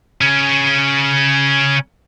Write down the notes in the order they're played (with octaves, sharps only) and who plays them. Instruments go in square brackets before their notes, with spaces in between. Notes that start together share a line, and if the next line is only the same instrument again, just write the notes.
[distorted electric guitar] C#3 C#4